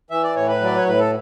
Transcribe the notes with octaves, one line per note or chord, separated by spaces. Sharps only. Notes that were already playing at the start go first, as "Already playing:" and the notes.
E3 E5
D5
A2 C#5
B4
F#3 D5
C#5
A2 B4
A4